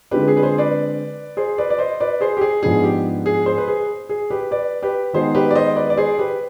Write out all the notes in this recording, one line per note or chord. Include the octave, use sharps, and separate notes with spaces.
D3 G#3 C4 F4 G4 B4
G#4
B4
G#4 C5
B4 D5
G#4 C5
B4 D5
D5
C5 D#5
B4 D5
G#4 C5
G4
G#4
G#2 F3 B3 D4 G#4
G4
G#4
G#4 C5
B4
G#4
G#4
G4 B4
B4 D5
G4 B4
D#3 G#3 B3 D#4 G#4 C5
G4 B4
D5
C5 D#5
B4 D5
D5
G#4 C5
G4 B4